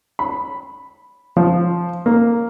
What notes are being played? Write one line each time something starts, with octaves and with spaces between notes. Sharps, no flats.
B5
F3
A#3